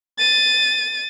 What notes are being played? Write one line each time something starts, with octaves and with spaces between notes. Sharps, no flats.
A6 D#7